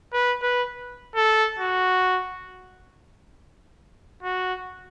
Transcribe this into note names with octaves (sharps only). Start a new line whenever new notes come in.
B4
B4
A4
F#4
F#4